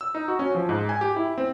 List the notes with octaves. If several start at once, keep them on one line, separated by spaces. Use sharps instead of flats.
E6
D#4
F#4
C#4
F3
G#2
G#5
G4
E4
C4